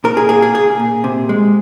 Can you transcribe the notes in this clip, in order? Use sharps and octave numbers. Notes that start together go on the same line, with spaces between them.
A#2 A#4
G#4
A#3 G#4
G#4
A#2 G#4
A#2
C3
G#3